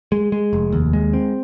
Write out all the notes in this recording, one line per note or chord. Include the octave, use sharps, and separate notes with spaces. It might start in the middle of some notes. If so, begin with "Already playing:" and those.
G#3
G#3
F1
D#2
G#3
C4